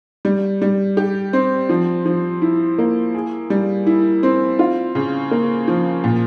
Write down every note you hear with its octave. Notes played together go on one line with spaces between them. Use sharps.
G3
G3
G4
C4
F3
F3
E4
A#3
G#4
G3
E4
C4
F4
C#3
A#3
F3
A#2